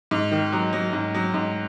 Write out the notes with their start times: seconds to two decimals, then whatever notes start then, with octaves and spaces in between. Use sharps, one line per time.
0.11 G#2
0.32 D#3
0.52 F#3
0.73 F#3
0.93 G#2
1.15 F#3
1.34 G#2